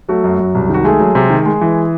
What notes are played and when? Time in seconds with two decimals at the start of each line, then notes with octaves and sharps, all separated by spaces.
0.09 F#3 A3 F#4
0.24 F#2
0.39 F#2
0.55 C2
0.70 D#3 F#4
0.84 G#3 A3 G#4
1.00 F#3
1.15 C3
1.30 D#3
1.46 G#3
1.61 E3